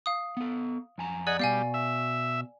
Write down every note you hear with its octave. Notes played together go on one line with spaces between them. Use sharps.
F5 D#6
B3 A4
F2 G#5 A#5
G#4 D5 D#5 F#5
B2 G3 B3 D5 F5 G#5
E5